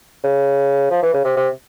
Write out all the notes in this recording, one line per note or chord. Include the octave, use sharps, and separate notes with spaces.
C#3
F3
E3
C#3
C3
C3